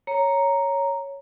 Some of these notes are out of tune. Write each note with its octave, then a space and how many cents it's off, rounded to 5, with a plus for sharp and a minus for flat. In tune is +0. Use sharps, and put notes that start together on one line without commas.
C#5 +0 A#5 +0